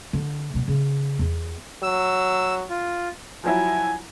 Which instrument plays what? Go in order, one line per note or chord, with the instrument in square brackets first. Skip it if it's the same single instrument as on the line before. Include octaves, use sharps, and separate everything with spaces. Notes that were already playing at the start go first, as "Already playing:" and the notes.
[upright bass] D3
B2 G3
C#3
E2
[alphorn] F#3 [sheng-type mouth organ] E6
[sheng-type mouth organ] F4
[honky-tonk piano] F3 F#3 E4 [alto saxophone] G#5